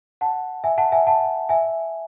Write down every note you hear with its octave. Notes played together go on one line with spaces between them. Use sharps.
F#5 A5
E5 G#5
F#5 A5
E5 G#5
F#5 A5
E5 G#5